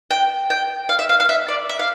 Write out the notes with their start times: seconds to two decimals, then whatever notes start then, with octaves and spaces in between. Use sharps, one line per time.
0.11 G5
0.50 G5
0.89 F5
0.99 E5
1.09 F5
1.20 F5
1.29 E5
1.48 D5
1.69 E5
1.79 F5